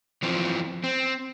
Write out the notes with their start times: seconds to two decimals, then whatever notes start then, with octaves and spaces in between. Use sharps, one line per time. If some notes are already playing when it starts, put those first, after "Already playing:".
0.23 E3 F3 C4
0.84 C4